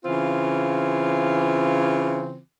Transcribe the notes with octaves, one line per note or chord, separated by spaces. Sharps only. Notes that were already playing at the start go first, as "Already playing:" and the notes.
C#3 E3 C4 F4